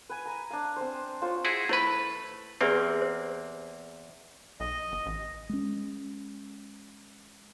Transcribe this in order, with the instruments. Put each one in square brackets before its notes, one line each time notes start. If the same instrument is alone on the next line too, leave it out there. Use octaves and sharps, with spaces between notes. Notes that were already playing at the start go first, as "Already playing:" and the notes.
[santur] B4 G#5
G#5 A#5
D4 F5
C4 C5
F4 C5 C#5
[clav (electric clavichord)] E4 F#4 G#4
[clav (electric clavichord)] A3 B4 [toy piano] E4 C5 B5
[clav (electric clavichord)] E2 A#3 C4 [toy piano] G4 G#4 B4
[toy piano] C5
[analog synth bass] B1 [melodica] D#5
[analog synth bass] G1
A1
[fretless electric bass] G#3 C#4